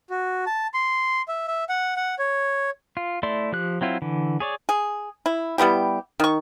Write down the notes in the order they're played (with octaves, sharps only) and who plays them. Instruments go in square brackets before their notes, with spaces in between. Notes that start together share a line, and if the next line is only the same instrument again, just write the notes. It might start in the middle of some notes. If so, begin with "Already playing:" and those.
[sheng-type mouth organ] F#4
A5
C6
E5
E5
F#5
F#5
C#5
[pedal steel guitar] F4
A3 E4 D5 C6
F3 G4 F#6
F#3 C4 E4 F4
D3 E3
G#4 C#5 D5
[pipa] G#4
E4
G3 B3 E4 G4
D#3 C#6